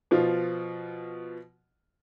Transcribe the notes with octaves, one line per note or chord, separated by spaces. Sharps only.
B2 F3 F4